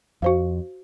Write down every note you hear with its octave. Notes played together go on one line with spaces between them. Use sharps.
F2 F#4 C5 F5